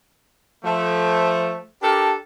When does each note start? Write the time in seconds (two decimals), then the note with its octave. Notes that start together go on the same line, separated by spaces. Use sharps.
0.64 F3 A3
1.81 D4 G4 A4 A#4